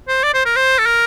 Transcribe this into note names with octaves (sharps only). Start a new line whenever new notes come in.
C5
D5
C5
A#4
C5
A4
A#4